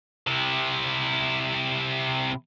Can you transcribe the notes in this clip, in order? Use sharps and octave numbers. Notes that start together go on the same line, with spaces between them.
C3 E4